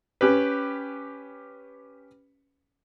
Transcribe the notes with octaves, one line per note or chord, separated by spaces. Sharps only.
C#4 G4 B4